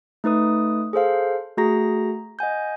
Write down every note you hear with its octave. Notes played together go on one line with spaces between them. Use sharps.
A3 D#4 B4 D#6
G#4 A4 C5 F5
A3 F#4 G#4 A#5 A#6
D#5 F#5 G#5 G6